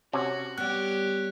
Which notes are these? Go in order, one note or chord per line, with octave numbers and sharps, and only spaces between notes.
C3 C#4 F#4
G3 B3 G4 C#5 F#6